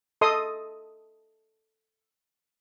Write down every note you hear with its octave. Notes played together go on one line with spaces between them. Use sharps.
A4 D#5 C6 D#6